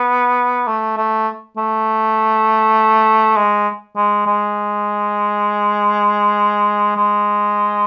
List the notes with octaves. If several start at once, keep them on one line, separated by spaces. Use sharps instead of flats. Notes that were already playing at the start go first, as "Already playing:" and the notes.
Already playing: B3
A3
A3
A3
G#3
G#3
G#3
G#3